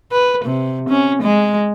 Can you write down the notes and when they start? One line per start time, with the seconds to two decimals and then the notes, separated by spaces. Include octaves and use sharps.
0.12 B4
0.45 C3
0.89 C#4
1.22 G#3